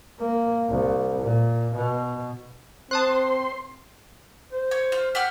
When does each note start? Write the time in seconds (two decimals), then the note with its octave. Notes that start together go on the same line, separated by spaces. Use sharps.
0.19 A#3
0.69 C2
1.22 A#2
1.75 B2
2.91 C4 C5 A5 C6 D#6 F#6
4.53 C5
4.71 C#5
4.92 F4
5.15 G4 F#5 F6